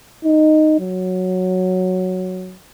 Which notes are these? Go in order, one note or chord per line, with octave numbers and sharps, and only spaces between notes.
D#4
F#3